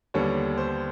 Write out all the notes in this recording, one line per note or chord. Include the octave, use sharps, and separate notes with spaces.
D#2 D3 G3 B3 C#5
C5